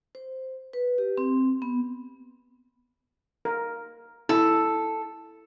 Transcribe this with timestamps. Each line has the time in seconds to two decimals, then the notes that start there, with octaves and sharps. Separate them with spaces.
0.15 C5
0.73 B4
0.98 G4
1.18 C4
1.62 B3
3.45 A#4
4.29 E4 A4